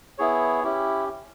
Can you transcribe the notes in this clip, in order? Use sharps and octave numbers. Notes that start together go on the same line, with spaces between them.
B3 E4 G#4 C#5
C#4 E4 G4